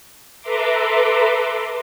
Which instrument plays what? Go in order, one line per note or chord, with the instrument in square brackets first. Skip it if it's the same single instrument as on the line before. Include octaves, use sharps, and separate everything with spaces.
[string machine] A4 B4 E5 A#5 C6 D6